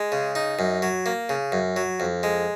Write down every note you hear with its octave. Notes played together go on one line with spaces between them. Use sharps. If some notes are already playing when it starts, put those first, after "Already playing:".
Already playing: G#3
C#3
D#4
F#2
F#3
A#3
C#3
F#2
F#3
F2
G#3